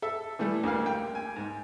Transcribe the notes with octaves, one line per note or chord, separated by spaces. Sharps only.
A4 E5
E3 G3 A3
D2 D3 A#3 F5
G5
G#5
G#2